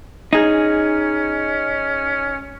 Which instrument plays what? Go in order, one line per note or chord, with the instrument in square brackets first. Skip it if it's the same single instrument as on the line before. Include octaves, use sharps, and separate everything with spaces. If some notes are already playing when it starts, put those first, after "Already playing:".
[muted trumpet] C#4 [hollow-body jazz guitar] D#4 G#4